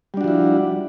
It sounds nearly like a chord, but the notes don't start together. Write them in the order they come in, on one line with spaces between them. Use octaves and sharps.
G3 D4 F#4 F3 E4